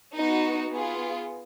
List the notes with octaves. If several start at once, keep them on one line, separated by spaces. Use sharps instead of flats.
B3 D#4 F#4
B3 F4 G#4